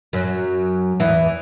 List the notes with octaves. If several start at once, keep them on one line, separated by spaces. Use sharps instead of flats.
F#2 F#3
E2 E3